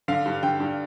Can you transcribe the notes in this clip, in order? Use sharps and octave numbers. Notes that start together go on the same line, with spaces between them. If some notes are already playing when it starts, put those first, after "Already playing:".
D3 F5
G2
D3 G5
G2